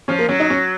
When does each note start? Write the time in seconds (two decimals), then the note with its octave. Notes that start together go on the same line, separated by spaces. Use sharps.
0.08 F3 C#4
0.18 A#3
0.28 F#3 C#4
0.40 D#4
0.50 C#4